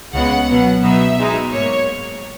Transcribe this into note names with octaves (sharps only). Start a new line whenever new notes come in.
C#2 C#3 G#3 B3 F#5
B2 F#3 B3
B2 F#3 B3 D#4 E5
B2 G#3 D#4
G#2 F#3 A#3 C#5